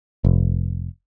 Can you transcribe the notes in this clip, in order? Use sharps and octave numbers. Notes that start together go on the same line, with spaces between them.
F1